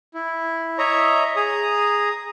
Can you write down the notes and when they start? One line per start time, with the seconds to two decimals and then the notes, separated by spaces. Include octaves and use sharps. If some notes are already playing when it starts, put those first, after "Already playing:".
0.14 E4
0.78 C#5 D#5 E5 A#5
1.36 G#4 A#5 D#6